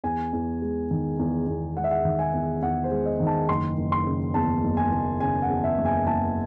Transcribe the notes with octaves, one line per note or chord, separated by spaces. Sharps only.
E2 G#5
E2
G#3
D#3
E2
E2
G#3 F#5
E5
F#5
D#3
G#5
E2
E2 F#5
C5
G#3
D#5
D#3
A5
F#1 C6
F#1
C6
C#3
E2 A5
F#1
G#5
F#1
C#3 G#5
F#5
E2
E5
F#1
G#5
F#1 A5